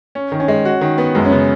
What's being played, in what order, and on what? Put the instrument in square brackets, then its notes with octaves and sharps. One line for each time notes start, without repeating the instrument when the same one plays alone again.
[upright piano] C#4
D#3
[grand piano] C#4
[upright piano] G#3
F#4
D#3
B3
[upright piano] F#2 [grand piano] G#3
[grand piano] C#4
[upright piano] C#3 [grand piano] B3